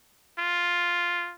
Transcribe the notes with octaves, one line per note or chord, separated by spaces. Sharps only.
F4